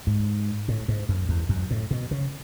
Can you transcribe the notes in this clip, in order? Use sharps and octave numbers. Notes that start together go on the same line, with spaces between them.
G#2
A2
G#2
F#2
E2
F#2
A2
B2
C#3